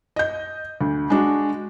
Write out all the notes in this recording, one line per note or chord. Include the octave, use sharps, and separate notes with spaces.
D#5 G6
D2
G#3 D4 F#4